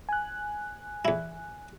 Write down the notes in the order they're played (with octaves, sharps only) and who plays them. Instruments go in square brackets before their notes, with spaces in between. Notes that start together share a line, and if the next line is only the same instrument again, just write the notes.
[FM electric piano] G#5 F#6
[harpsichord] E2 E4